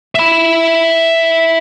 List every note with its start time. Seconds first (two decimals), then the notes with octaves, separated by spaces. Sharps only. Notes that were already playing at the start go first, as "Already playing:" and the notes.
0.15 E5 B5